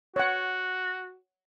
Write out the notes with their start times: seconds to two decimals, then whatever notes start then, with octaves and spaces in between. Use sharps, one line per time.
0.16 F#4 C#5 F#5